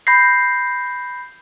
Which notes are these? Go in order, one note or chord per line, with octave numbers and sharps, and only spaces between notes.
B5 G6 A#6 C7